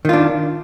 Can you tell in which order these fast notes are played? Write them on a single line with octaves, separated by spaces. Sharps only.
D#3 F4 D4